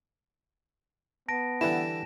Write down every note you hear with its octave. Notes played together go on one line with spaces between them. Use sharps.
B3 A5 A#6 D7
D3 E3 G3 E4 F#5 E7